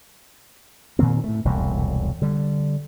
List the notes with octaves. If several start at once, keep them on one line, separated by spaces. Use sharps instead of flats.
A#2 D#3 A#3 C4
A2 A3
E1 C2 F2 A#2
D3 G3